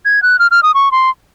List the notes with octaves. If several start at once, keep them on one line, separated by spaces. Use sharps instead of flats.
G#6
F#6
F6
F6
D#6
C#6
C6